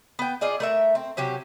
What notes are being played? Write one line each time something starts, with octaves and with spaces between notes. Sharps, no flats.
B3 G5
F4 G#4 D5 D#5
A3 A#4 E5
C4
C3 F#3 C#4 G4